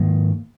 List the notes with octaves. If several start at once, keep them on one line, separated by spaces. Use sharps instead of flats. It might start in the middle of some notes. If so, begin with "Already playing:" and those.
Already playing: G#2 D#3 A#3